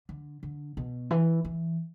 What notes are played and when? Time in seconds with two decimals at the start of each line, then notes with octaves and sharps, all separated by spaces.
0.09 D3
0.43 D3
0.77 B2
1.11 E3
1.45 E3